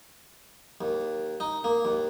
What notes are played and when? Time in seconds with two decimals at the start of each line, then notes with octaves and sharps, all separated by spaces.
0.81 D#2
1.40 D#4
1.64 A#3
1.85 D#2